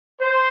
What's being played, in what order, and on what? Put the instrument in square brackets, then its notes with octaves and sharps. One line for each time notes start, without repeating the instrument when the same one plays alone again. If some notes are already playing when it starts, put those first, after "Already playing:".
[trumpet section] C5